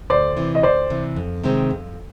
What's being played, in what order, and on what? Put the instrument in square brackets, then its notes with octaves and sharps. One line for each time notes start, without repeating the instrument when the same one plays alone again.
[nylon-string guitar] D2 [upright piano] C5 D5
[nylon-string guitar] C3 E3
[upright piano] D#5
[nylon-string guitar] D2 [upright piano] C5 D5
[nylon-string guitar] C3 E3
F2
C3 D#3 G#3 C4
F2